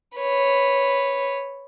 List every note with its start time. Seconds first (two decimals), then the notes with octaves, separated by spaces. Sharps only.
0.17 B4 C#5